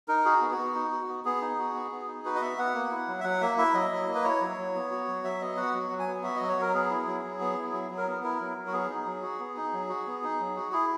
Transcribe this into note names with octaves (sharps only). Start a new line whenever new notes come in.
D#4 A#4
F#4 G#4
B3
F#4
B3
D#4
F#4
B3
B3 G#4
D#4
F#4
B3
B3
D#4
F#4 B4
D#5
B3 E5
B3 F#5
A#3
E4
F#3
E5
F#3 F#5
A#3 E5
E4 E5
F#3 D#5
F#3
A#3
B4
E4 C#5
F#3
F#3
B3
F#4
F#3
F#3 E5
B3 D#5
F#4 F#5
F#3
F#3
G#5
B3
F#4 E5
F#3 D#5
C#5
F#3 A#4
B3 G#4
E4
F#3
F#3
B3
E4
F#3
F#3
A#4
B3
E4 A#4
F#3
F#3
F#4
B3 G#4
D#4
F#3
F#4
B3
D#4
F#3
F#4
B3
D#4
F#3
F#4
E4 G#4